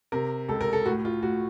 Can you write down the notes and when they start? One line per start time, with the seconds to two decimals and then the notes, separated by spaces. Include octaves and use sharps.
0.12 C3 A#4
0.48 C#2 A4
0.61 A#4
0.73 A4
0.86 A2 F#4
1.05 F4
1.23 A2 F#4